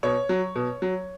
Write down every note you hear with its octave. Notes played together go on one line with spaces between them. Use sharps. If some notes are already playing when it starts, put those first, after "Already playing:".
B2 C#5
F#3
B2
F#3